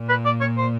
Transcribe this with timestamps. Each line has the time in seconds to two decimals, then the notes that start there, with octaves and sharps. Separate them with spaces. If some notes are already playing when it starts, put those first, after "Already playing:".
Already playing: A#2
0.09 B4
0.26 D5
0.41 C#5
0.57 C5